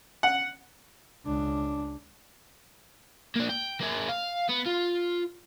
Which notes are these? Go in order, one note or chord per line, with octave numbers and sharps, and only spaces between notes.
F#5
C#2 D4
A#3 D4
G5
A#3 G#4
F5
B3
F4